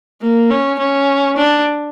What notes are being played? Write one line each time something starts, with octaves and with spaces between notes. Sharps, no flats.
A#3
C#4
C#4
D4